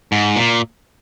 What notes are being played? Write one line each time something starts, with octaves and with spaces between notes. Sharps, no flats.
G#2
A#2